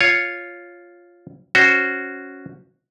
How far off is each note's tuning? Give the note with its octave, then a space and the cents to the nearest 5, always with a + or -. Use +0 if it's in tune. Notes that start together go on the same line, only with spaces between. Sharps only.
F4 +0 C#5 +0
C#4 +0 F#4 +0 C5 +5